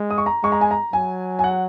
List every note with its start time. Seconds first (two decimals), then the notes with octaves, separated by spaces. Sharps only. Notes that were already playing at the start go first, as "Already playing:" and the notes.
Already playing: G#3
0.10 D#6
0.18 C#6
0.26 A#5
0.43 G#3 C#6
0.52 A#5
0.61 G#5
0.71 A#5
0.93 F#3 G#5
1.39 G#5
1.44 F#5